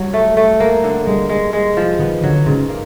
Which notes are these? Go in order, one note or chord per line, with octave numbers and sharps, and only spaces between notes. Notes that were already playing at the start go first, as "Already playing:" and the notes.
Already playing: F#3 G3
A3
A3
A#3
D3
G3 G#3
G#3
G#3
F3
D#3 B3
D3 F#3
G#2 C#3
A#3